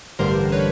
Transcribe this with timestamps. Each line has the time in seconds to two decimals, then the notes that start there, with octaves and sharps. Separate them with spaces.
0.19 A1 G2 D3 G3 A#4 C5
0.52 B4 C#5